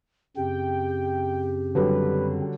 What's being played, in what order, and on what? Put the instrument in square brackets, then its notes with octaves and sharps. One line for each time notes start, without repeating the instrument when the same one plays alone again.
[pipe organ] F#2 C#3 C4 [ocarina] G4 [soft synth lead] G5
[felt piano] D3 F#3 G3 [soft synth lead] B4